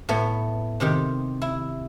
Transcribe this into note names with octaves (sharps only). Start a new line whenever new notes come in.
A2 A3 B3
C3 D#3 G4
E4